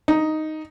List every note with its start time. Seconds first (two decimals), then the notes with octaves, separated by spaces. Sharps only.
0.08 D#4